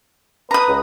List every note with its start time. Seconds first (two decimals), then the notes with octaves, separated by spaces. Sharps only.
0.51 B4 A#5 D#6
0.68 C#2